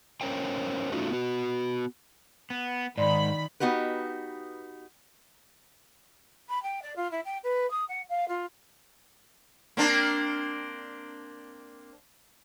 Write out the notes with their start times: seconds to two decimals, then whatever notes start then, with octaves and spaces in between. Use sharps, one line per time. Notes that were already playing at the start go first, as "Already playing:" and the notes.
0.21 C#4 A#4 C5 C#5 G5
0.92 A3 C#4 D#4 F4 F#4
1.11 B3 F#4
2.50 B3
2.97 G#2 D#3 D5 B5 C6
3.60 B3 D#4 F#4 G4 B4
6.49 B5
6.62 G5
6.82 D5
6.96 F4
7.11 E4
7.25 G5
7.43 B4
7.70 D#6
7.88 F#5
8.09 F5
8.28 F4
9.77 A#3 C4 D4